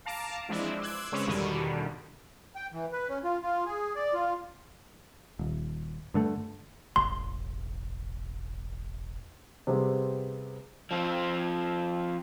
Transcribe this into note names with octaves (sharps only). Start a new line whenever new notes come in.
F5 A5 A#5 D6
E3 F3 G#3 C4 D4 E4
C6 D6 E6 F#6 G#6
C#3 G#3 C4 C#4 B4 C#5
E2 G2 B2 D3 D#3 G3
G5
E3
B4
C#4
F4
F4
G#4
D5
F4
D#1
G2 D3 A3
E1 A1 C6
C3 G3 B3 C4 G#4
F3 C4